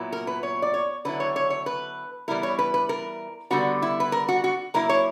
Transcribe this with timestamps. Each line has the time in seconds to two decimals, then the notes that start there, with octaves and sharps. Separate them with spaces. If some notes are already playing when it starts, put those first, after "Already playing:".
Already playing: A#2 F#3 B3 E4
0.12 A#4
0.27 B4
0.43 C#5
0.62 D5
0.74 C#5
1.05 D3 F#3 B3 E4 B4
1.20 C#5
1.36 C#5
1.50 C#5
1.66 B4
2.28 E3 G3 B3 E4 A#4
2.43 C#5
2.59 B4
2.74 B4
2.89 A#4
3.50 D3 G3 B3 F#4
3.82 E4
4.00 B4
4.12 A#4
4.28 F#4
4.44 F#4
4.74 F#3 A#3 E4 A#4
4.89 C#5